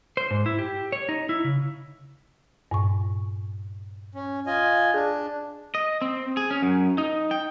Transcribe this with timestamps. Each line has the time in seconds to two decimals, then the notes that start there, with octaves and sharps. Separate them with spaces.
0.17 C5
0.31 G#2
0.46 E4
0.59 G4
0.92 C#5
1.09 D#4
1.29 E4
1.44 C#3
2.71 G2 A#2 C#6
4.15 C#4
4.46 F4 D#5 G#5
4.94 D4 G#4
5.75 D#5
6.02 C4
6.37 G#4
6.51 C#4
6.62 F#2
6.98 D#4
7.31 G5